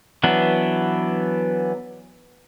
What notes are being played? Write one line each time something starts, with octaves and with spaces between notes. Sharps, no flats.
E3 F#3 B3 D4